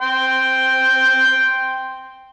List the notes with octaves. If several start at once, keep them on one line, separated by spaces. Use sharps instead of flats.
G5 C6